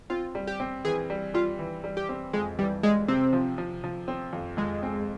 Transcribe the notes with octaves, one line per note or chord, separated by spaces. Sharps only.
C4 F4
G3
G4
C4
E3 G#4
G3
G3 F4
E3
G3
G4
C4
F2 G#3
E3 G3
G3 G#3
C3 C4
F3
F3
F3
C4
F2
F2 G#3
C4